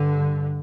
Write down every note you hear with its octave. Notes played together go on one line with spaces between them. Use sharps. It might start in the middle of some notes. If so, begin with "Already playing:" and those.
Already playing: G2 D3